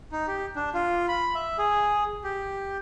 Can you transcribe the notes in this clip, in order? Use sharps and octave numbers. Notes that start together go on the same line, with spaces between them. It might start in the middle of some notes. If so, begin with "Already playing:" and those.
D#4
G4
D4
F4
B5
E5
G#4
G4